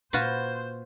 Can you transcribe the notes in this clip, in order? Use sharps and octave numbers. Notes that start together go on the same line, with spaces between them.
A#2 F4 F#4 B4 C5